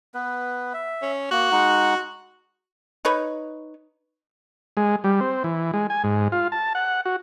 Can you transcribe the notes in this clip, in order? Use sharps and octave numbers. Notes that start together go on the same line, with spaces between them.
B3 B4
E5
C#4
A#3 F#4
G#3 D#4 F#5
D#4 B4 C#5
G#3
G3
C4
E3
G#3
G#5
G#2
F4
A5
F#5
F#4